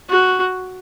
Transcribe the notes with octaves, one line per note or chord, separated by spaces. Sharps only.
F#4